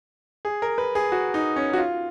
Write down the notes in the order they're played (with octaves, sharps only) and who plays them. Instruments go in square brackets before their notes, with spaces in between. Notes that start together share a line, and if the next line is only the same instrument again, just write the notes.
[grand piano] G#4
A#4
B4
G#4
F#4
D#4
C#4
F#4
F4